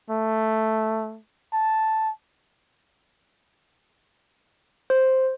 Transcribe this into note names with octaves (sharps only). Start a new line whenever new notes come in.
A3
A5
C5